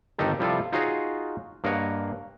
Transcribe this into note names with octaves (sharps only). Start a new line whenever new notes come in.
G1 D#3 D#4 G4 A4
C3 F3 G3 E4 F4 A4
D#4 F4 F#4 G#4 C#5 D#5
G2 A#3 A#4 C#5 D#5 F#5